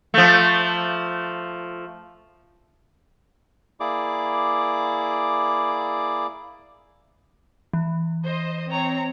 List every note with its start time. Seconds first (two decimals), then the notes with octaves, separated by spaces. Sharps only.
0.14 F3 A3
3.80 A#3 E4 G#4 D5 D6
7.73 E3
8.24 C5 D#5
8.68 C4 C#5 A#5